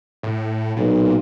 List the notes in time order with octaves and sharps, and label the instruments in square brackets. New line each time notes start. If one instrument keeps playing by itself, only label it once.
[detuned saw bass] A2
[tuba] B1 [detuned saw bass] A#2